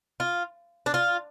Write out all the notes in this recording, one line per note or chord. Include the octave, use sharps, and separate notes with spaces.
F4
D4
F4